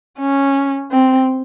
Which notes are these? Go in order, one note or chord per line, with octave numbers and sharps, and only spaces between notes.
C#4
C4